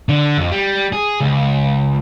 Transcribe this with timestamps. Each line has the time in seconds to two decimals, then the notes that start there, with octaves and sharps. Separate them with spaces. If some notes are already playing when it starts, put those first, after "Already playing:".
0.09 D3
0.38 F2
0.52 G3
0.93 G#4
1.20 C#2